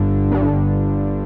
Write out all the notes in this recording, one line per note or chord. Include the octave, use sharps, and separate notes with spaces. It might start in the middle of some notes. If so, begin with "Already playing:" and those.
Already playing: G1 G2 D3
G1 G2 D3